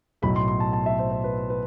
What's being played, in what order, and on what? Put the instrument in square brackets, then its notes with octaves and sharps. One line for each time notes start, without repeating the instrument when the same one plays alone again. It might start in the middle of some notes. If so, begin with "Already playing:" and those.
[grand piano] B1 A2 F#3 B5
C6
C6
A5
A5
E5
C5
C5
B4
B4